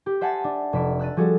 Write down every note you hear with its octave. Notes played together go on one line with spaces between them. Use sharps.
G4
C5 E5 F#5 G#5 A5
D4
F1 E5 D7
E6 F#6 A6 D#7
F3 G3 F#4 G#4 A4